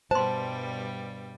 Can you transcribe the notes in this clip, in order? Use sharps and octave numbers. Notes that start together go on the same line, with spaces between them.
G2 B2 G3 C5 A5 C6